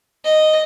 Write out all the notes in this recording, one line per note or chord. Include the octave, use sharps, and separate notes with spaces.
D#5